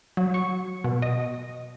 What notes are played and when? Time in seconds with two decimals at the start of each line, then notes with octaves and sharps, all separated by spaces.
0.17 F#3
0.34 C#6
0.84 B2
1.02 D#5